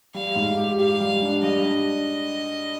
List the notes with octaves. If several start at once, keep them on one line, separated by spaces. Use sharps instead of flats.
G3 F5
G#2
G4
G4 F5
G3
D4
G3 D#5
D4